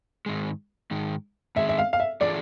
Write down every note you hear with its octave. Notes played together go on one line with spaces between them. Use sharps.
G#2 D#3 G#3
G#2 D#3 G#3
G#2 D#3 G#3 E5
E5
F5
F5
E5
E3 A3 D4 F4 G#4 D5